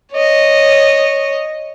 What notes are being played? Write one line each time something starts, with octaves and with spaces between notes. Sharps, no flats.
C#5 D#5